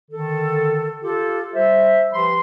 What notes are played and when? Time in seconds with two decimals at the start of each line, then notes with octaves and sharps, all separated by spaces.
0.11 D3 D#3 A4
1.03 F4 G4 A4
1.54 G3 C5 E5
2.13 F3 G4 B4 B5 C6